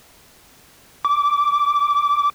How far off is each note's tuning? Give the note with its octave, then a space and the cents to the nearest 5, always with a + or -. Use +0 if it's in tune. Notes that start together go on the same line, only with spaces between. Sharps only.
D6 -15